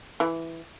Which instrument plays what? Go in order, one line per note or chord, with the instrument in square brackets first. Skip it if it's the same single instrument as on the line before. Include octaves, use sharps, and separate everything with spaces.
[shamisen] E3